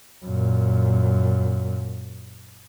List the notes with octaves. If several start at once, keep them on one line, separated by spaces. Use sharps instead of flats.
F#2 A#2